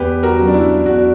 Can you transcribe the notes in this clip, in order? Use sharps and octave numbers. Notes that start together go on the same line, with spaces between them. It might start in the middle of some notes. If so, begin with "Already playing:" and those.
Already playing: E2 G4 B4
F#4 A#4
C#3 F#3
D4
E4
E2 D4 F#4